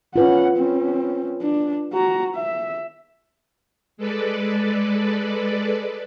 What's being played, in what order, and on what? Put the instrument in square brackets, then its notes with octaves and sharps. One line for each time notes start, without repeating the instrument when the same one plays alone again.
[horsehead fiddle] C#4 F#5 [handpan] F4 B4
[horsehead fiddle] C4 C#4
D4
F#4 A#5
E5
[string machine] G#3 A4 B4 D5